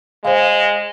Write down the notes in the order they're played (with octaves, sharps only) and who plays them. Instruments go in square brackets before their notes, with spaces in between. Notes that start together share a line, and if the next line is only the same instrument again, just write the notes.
[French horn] G#3 [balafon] C5 F5